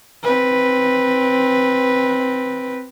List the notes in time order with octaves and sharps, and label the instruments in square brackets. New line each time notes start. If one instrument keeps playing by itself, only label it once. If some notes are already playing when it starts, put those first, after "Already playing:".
[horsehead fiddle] C4 B4